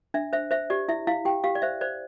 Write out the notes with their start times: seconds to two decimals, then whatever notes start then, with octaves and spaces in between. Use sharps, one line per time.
0.14 D4 E5
0.33 C5 E5
0.51 C5 E5
0.70 G4 D5
0.88 E4 E5
1.07 E4 F5
1.25 G4 G5
1.44 G4 F5
1.55 D5
1.62 C5 E5
1.81 C5 D5